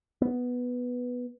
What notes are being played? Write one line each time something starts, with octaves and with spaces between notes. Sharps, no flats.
B3